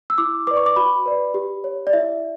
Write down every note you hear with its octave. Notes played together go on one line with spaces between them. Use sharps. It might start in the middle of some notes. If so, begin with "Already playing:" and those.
E6
E4 D6
B4 D5 D6
C#6
D6
F#4 B5
B4 D5
G4
C#5
D5
E4 E5